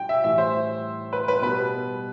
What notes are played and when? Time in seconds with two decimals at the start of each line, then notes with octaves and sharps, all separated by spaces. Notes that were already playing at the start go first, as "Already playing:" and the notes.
Already playing: G3 G5
0.09 E5
0.24 A2 E3 G3 E5
0.38 C5
1.13 B4
1.28 B4
1.42 B2 G3 B4